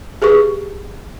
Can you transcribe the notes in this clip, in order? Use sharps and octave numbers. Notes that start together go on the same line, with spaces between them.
G4 G#4 B4 C#6